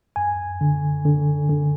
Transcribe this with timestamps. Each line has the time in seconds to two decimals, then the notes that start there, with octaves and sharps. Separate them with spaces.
0.16 F#2 G#5
0.61 D3
1.05 D3
1.50 D3